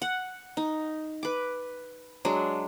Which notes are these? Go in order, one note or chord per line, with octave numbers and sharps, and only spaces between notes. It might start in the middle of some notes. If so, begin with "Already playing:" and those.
F#5
D#4
B4 D6
F#3 G#3 D4